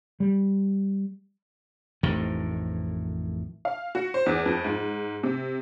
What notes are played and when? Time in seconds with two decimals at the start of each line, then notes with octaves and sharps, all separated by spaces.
0.20 G3
2.03 A1 F2 A2 D#3
3.65 F5
3.95 F#4
4.14 C5
4.26 E2
4.46 F2
4.64 G#2
5.23 C3